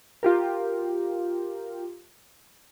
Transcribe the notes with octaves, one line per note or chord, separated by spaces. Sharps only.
F4 G4 A#4